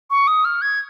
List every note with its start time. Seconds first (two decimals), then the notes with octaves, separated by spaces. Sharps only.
0.10 C#6
0.27 D#6
0.45 F6
0.62 G#6